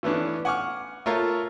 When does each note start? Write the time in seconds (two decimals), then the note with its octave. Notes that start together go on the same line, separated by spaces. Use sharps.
0.03 E3 A3 B3 C#4 D4
0.45 F#5 G#5 C#6 D6 F6
1.06 A3 F4 A#4 C#5 F5